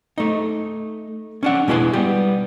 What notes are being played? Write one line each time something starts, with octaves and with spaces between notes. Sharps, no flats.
A3 D#4
C#4 D4 F#5
B2 G#3 E4 B4 G#5 C6
G3 B3 G4